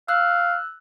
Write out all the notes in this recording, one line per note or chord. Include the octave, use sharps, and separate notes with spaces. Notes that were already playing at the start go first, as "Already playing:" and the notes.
F5 E6 F#6